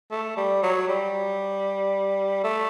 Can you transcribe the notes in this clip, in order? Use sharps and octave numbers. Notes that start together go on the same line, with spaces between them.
A3
G3
F#3
G3
A3